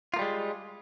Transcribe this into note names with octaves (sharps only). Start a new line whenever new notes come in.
G3 G#3 A#3 F4